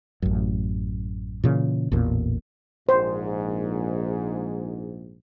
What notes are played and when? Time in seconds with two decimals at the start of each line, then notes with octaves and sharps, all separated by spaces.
0.22 A1 F#2
1.44 A#2 C#3 E3
1.92 A1 E2 A#2
2.89 A#1 G#2 C5